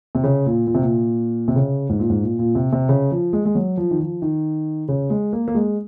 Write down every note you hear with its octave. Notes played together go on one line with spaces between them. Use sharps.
C3
C#3
A#2
A#2
C3
A#2
C3
C#3
G#2
A#2
G#2
A#2
A#2
C3
C3
C#3
F3
G#3
G#3
F#3
F3
D#3
F3
D#3
C#3
G#3
A#3
A#3
G#3